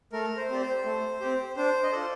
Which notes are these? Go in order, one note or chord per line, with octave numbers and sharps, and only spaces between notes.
A3 A#4
C5
C4 G4 D5
C5
A3
C4 G4
D4 C5
D#5
F4 A4 D5